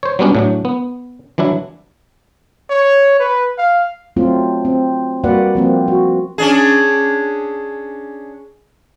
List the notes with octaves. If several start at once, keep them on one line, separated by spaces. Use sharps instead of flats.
C5 C#5
F#3 G3 B3 C#4 D4
A2 F#3 D4
B3
E3 F#3 D4 E4
C#5
B4
F5
F#3 A3 C4 F4
C4
G3 A#3 F#4 B4 D5 F#5
F3 A#3 C4
F#4
C#4 D4 G#4